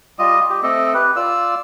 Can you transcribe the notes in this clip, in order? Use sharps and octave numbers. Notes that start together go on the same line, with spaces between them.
G3 F4 D#5 D#6
G4
A3 C4 A4 D#5
G4 B4
F4 D5 E6